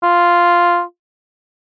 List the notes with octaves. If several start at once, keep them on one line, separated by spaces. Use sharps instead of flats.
F4